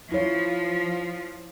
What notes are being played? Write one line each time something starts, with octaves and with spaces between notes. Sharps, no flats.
F3 E4 C#5